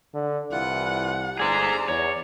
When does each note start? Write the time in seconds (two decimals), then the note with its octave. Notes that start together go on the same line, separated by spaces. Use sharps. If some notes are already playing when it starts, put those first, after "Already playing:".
0.14 D3
0.52 C2 E3 F4 F#5 F#6
1.39 G1 G#4 C5 D5 A#5
1.88 E2 C#5